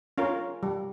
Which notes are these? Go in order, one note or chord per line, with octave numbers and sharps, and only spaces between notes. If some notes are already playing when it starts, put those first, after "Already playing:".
C#4 F4 A#4 F5
G3